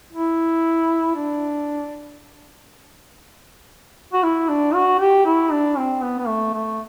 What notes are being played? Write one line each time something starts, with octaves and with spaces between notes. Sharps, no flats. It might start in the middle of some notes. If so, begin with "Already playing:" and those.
E4
D4
F#4
E4
D4
F#4
G4
E4
D4
C4
B3
B3
A3
A3